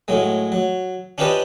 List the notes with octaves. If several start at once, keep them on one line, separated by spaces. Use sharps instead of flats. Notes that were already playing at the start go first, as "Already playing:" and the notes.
A2 F#3 G#3
F#3
C#4 D4 F4 G4 B4 D#5